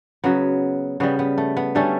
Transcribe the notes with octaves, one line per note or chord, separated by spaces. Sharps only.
C#3 F#3 B3
C#3 G3 B3
B3
A3
B3
D3 G3 A3 C#4